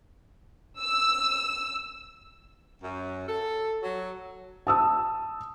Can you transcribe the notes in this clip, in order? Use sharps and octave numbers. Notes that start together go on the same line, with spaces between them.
E6
F#2
A4
F#3
A5 D#6 E6